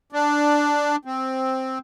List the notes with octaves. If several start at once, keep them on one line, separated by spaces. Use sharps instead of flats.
D4
C4